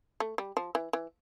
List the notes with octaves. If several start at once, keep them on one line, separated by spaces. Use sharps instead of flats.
A3
G3
F3
E3
E3